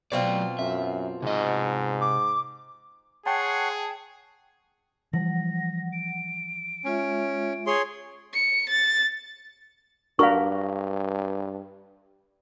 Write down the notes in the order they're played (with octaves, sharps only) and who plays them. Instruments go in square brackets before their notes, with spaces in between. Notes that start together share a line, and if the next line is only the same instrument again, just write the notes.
[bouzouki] B2 C4 F4 [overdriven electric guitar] F#3 D5
[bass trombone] F#2 [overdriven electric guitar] E5
[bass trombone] G#2 [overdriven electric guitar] C3 D#5
[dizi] D6
[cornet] G#4 [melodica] C#5 F#5 C6 [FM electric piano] G5 A5
[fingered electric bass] E3 F3 G3 [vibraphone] F#5 [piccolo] A#6
[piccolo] D7
[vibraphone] G#3 F4 E5 [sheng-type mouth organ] C#4
[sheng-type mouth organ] G#4 C#5 C6
[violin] C#7
A6
[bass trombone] G2 [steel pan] D4 F#4 A#4 [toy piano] F5 C#6